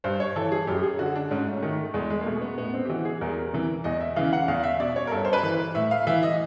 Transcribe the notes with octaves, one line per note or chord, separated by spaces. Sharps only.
G2 C5
C#5
E3 A4
G#4
F#2 G4
G4
G#4
D3 F#4
D4
G#2 C#4
A3
D#3 A3
E2 G#3
G#3
A#3
B2 A3
B3
A2 B3
C4
G4
E3 F#4
G#4
E2 A#4
C3 E3
E2 D#5
E5
C#3 E3 F5
F#5
E2 F5
E5
B2 D5
C#5
A#4
G2 A4
C5
B4
E3
A2 E5
F5
E3 E5
D#5